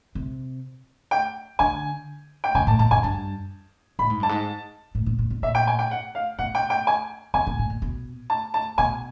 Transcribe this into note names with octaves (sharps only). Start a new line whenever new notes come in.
C3
G5
D3 G#5
G5
C#3 G#5
A2 A5
A#2 A5
F#2 G#5
G2 A5
A2 B5
G#2
G2 A5
G#2
A2
A#2
A#2
B2
A#2 E5
G5
G#5
G5
F#5
F5
B2 F#5
G5
G5
G#5
C3 G#5
B2
A2
A#2
B2
A5
A5
B2 G#5